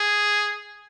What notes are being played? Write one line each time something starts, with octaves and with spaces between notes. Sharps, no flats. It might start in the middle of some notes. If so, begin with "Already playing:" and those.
Already playing: G#4